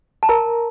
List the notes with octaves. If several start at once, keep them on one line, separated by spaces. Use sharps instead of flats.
A5
A#4 A#5